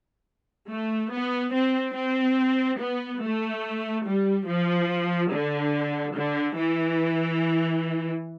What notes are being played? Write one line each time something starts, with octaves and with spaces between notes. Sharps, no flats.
A3
B3
C4
C4
B3
A3
G3
F3
D3
D3
E3